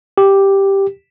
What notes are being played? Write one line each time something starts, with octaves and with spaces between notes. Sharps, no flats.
G4